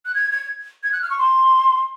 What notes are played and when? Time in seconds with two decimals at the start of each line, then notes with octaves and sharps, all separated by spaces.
0.06 F#6
0.15 G#6
0.32 G#6
0.84 G#6
0.92 F#6
1.02 F6
1.10 C#6
1.18 C6